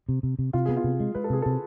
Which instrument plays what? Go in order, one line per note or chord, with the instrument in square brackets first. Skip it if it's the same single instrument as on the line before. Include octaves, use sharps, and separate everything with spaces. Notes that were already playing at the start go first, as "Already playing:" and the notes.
[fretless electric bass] C3
C3
C3
[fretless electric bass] C3 [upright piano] F4
[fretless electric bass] B3 [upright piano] G#4
[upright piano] F4
[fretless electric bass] C3
G#3
[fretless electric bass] G#3 [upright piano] B4
[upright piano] A4
[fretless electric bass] C3 [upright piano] G#4
[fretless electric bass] C3 [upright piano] A4